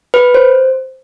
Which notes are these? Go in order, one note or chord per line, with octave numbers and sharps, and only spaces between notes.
B4
C5